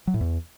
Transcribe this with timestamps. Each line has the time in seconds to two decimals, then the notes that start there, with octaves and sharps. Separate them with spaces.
0.07 F#3
0.14 A2
0.21 E2